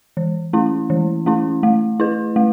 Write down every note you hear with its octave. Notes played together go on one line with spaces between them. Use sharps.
E3
A3 C#4 E4
E3
A3 C#4 E4
A3
E4 B4
A3